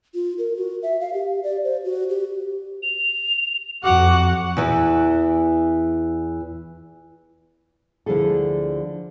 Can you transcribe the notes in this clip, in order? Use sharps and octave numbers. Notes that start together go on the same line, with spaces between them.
F4
A#4
F#4
E5
F5
G4
D5
C5
F#4
G4
F7
F2 F#4 F#5 D6
E2 E3
D2 D3 F3 E4 G#4 A4